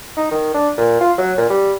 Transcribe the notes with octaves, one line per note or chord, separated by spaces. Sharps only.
D#4
D#3
D4
A#2
F4
F#3
A#2
G3